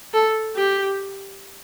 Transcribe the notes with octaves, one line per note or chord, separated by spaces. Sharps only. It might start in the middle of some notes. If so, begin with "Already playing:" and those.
A4
G4